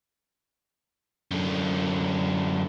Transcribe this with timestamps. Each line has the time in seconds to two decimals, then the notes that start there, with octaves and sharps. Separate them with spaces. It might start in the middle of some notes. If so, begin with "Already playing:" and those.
1.31 F#2 D3